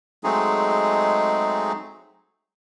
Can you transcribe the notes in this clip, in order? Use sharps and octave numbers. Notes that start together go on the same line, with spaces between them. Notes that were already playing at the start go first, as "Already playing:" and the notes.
F#3 G#3 A3 C4 D#4 G#4